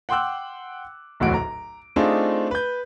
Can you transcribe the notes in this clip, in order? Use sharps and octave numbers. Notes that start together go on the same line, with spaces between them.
F#5 G5 C6 D6 E6 F#6
D1 B1 E2 A2 F#4 D7
A#5
A3 C4 D4 D#4 F4 G#4
B4 G6